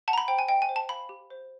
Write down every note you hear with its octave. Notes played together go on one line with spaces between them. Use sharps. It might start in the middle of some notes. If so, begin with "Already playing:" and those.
F#5 A5
A#5
B5
C5 G5
G#5
D#5 G5
G#5
C5
A5
F5 B5
G4
C5